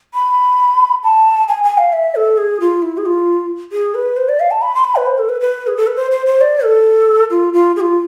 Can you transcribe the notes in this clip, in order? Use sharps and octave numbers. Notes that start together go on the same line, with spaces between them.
B5
A5
G#5
G#5
F5
E5
A4
G#4
F4
E4
G#4
F4
G#4
B4
C5
D5
F5
A5
B5
C6
B5
B4
C5
A4
B4
B4
G#4
A4
B4
C5
C5
C5
D5
A4
F4
F4
G#4
F4